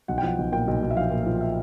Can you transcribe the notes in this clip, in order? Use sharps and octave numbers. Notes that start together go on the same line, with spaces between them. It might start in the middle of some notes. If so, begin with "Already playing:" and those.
B1 F#5
G5
F3 F#5
B1
A#2 G5
B1
B1
E5
F3 F5
A#2
F3
E5